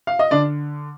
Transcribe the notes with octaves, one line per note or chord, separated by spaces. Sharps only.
F5
D#5
D3 D4 D5